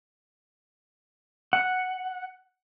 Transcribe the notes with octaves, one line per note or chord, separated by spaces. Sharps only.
F#5